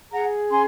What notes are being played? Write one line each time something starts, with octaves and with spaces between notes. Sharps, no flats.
G#4 F#5 A#5
C#4 G#5 C6